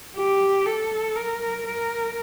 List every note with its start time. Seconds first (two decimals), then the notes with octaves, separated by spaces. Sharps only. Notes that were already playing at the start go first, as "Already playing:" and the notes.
0.17 G4
0.66 A4
1.16 A#4
1.67 A#4